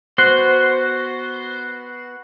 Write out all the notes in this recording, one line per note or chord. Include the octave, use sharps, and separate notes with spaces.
B3 F#4 C5 F#6 C7